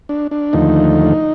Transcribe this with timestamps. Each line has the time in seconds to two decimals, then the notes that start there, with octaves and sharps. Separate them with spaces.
0.09 D4
0.31 D4
0.53 D#2 D3 F3 A3 D#4